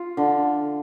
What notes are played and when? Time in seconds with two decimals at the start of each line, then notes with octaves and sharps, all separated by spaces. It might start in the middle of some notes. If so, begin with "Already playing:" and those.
Already playing: F4
0.17 D3